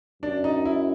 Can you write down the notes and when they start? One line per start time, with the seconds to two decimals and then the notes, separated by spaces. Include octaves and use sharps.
0.22 F#2 D4
0.44 D#4
0.65 E4